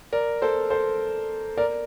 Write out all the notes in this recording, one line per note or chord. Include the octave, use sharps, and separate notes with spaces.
A#4 D5
A4 C5
A4 C5
A#4 D5